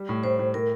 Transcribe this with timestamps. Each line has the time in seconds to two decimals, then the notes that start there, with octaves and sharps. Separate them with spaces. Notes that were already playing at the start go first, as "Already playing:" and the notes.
Already playing: G3
0.09 A2
0.23 A2 C5
0.39 A2
0.54 A2 A#4